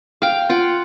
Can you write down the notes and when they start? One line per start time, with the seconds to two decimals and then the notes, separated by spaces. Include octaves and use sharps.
0.22 F5 G5
0.49 F4 F#5 G5